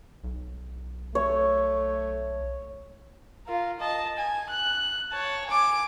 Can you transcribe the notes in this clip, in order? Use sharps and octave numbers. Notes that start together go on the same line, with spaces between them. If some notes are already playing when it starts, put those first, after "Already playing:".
B1
A3 C#5
F4 A#4
D#5 A5
G#5
F#6
C#5 A5
G#5 D6